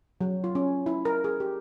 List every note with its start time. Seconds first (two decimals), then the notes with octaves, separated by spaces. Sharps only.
0.21 F#3
0.44 F4
0.55 C#4
0.86 E4
1.05 A#4
1.24 G#4
1.40 G4